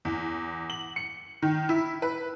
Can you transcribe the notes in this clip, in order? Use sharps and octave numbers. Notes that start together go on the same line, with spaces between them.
E2
F#7
C#7
D#3
E4
B4